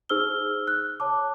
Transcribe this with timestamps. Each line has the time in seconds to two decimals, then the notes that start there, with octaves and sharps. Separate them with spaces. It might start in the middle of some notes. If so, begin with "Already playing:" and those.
0.09 D#4 G#4 C5 E6 F6 G7
0.67 F#6
1.00 C#5 A5 D6